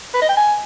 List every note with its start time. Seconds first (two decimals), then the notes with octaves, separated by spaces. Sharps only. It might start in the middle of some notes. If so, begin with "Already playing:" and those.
0.14 B4
0.22 D#5
0.29 G5
0.37 G#5